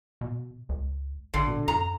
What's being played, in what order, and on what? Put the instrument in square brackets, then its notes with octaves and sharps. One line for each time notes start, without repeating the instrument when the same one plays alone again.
[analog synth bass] B2
C#2
[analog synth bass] A1 [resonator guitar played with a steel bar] D3
[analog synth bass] B2
[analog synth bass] F#2 [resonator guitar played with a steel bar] A#5